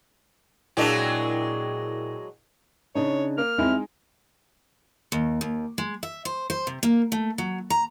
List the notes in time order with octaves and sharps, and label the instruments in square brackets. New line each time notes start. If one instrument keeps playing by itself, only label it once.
[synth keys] A#2 E4 G5 [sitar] F#3 G#3 D4
[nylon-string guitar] C#3 D4 D#4 [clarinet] C#5
[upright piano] A#3 [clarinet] F6
[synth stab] E2 C4 [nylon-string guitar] G3 E4 [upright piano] G#3 D#4
[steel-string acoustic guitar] D#2
D#2
G#3
E5
C5
C5
C3
A#3
A3
F#3
A#5